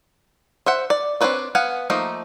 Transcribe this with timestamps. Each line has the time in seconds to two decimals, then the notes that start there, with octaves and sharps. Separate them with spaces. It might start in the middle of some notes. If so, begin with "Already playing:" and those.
0.66 C5 E5 F#5
0.90 D5
1.21 C4 D4 E4 B4 C#5
1.55 B3 F5 F#5 G#5
1.90 F3 A3 A#3 D#4